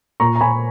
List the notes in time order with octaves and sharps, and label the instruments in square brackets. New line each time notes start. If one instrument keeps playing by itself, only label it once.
[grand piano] A#2 A#5 C#6
A#5
A#2 G#5 B5